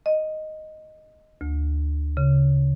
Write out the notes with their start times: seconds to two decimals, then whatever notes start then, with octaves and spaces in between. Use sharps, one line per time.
0.06 D#5
1.41 D2
2.17 C#3